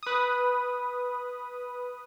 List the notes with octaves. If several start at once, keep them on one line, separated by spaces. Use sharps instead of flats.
B4 D#6